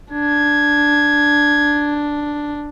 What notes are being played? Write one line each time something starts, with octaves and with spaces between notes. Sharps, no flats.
D4 G#6